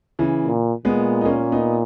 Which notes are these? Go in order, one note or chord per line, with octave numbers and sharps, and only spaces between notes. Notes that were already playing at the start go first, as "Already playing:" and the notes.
C#3 E3
A#2
A#2 G#3 B3
D#4
A#3 C#4
B3 D#4